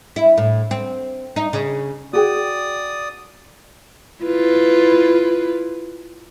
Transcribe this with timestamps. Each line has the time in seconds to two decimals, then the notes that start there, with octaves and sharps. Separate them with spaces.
0.16 E4
0.38 A2
0.71 C4
1.36 D#4
1.53 C#3
2.13 F#4 G#4 D5 G5 D#6
4.23 E4 F4 B4